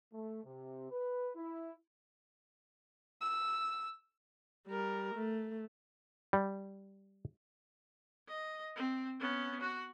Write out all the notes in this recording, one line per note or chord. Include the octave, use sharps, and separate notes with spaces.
A3
C3
B4
E4
E6
G3 A#4
A3
G3
D#5
C4
B3 C#4
F#4